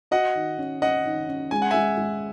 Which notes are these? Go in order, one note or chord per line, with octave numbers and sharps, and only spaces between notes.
F#4 D#5 F#5
D#3
C#4
C#4 D#5 F#5
D#3
C#4
G#3 G#5
F#5
G#3 E5 G#5
G#3